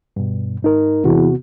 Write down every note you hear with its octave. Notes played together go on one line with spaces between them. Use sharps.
G2 B2
G#2 D#4 A#4
E2 C3 B3 F#4